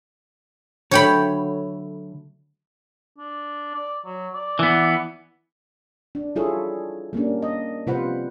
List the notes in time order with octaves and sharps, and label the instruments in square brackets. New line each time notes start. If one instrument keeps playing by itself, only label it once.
[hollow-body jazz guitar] D3 F#3 A3 [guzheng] C#5 G5 B5
[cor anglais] D4
D5
F#3
D5
[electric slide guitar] E3 B3
[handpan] D4
G3 E4 F4 G#4 A4 C#5
G3 A#3 C#4 D4
D#5
C3 G3 F4 B4 C5 F#5